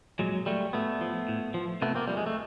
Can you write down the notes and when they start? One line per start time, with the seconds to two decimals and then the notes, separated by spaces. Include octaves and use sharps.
0.19 A#2 F#3 G#3
0.46 F#3 G3 A3
0.73 A2 A3 B3
1.01 F3
1.28 A2
1.54 F3
1.82 C3 A3 B3
1.95 A#3 C4
2.07 F3 G3
2.17 G#3
2.26 A3